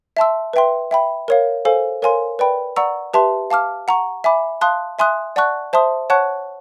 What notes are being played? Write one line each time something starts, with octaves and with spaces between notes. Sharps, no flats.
E5 A5 C6 E6
B4 E5 G5 C6
E5 G5 B5
A#4 C#5 F5
A4 C5 F5 G#5
A#4 C#5 F5 G#5 C6
B4 D5 G5 B5
D5 F#5 A#5 C#6 E6
G4 B4 E5 A5 C6
F5 A5 D6 F6
F#5 A#5 C#6
E5 G#5 B5 D6
F5 A5 C6 D#6 F#6
E5 G#5 C6 D#6 F#6
D5 F#5 A5 C#6 F#6
C5 E5 A5 C6 D#6
C#5 F#5 A5 C#6 F#6